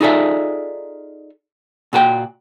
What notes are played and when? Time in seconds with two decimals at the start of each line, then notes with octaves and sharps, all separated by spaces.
0.01 D#4 F4 G#4 A4 D5 E5
1.93 A#2 F#4 A4 G5